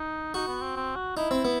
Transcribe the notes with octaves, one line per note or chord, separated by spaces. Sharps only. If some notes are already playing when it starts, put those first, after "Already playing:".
Already playing: D#4
D#4 F#4
B3
C4
C4
F#4
D#4 E4
C4
B3